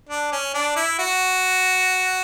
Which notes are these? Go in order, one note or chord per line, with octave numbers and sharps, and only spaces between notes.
D4
C#4
D4
E4
F#4